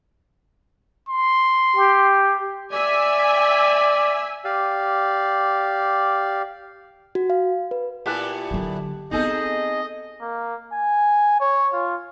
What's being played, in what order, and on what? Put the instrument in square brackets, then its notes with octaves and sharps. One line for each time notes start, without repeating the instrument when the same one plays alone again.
[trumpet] C6
[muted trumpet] G4
[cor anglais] D5 [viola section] E5 G#5
[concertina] G4 D5 F5
[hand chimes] F#4
F5
B4
[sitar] A#2 B3 E4 [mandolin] G4 A5 F#6
[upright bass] D3 F#3
[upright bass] B3 C4 [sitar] D#4 G#4 A4 [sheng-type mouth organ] D#5
[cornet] A#3
G#5
C#5
F4